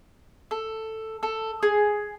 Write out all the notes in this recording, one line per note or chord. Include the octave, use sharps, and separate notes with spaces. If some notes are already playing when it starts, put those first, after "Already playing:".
A4
A4
G#4